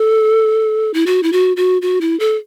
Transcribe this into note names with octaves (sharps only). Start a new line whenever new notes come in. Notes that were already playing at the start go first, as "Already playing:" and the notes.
Already playing: A4
E4
F#4
E4
F#4
F#4
F#4
E4
A4